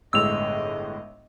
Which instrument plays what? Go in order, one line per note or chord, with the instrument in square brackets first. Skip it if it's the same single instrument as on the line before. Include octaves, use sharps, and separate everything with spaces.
[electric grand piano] G1 A2 G#3 [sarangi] D#5 [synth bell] E6 F7